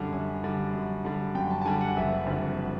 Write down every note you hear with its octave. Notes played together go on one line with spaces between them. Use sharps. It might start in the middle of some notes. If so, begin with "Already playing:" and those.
Already playing: F#2 D3 G3
F#2 G#5
D3 G3
F#2
D3 G3
F#2 G5
A5
A5
D3 G3 G#5
F#5
F#1 E5
F2 D3 G3